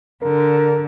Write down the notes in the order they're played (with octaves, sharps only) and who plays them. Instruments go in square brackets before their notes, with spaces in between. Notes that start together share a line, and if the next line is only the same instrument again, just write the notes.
[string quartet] D3 [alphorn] A#4